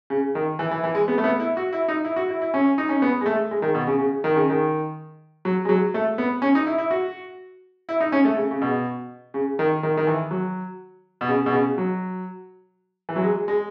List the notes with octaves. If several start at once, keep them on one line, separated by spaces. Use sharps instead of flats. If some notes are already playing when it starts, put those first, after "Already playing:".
C#3
D#3
E3
E3
E3
G#3
B3
A3
B3
E4
F#4
E4
D#4
E4
F#4
E4
E4
C#4
D#4
C#4
B3
G#3
A3
G#3
D#3
B2
C#3
C#3
D#3
C#3
D#3
F#3
G#3
F#3
A3
B3
C#4
D#4
E4
E4
F#4
E4
D#4
C#4
A3
C#3
C#3
B2
C#3
D#3
D#3
D#3
E3
F#3
B2
C#3
B2
C#3
F#3
E3
F#3
G#3
G#3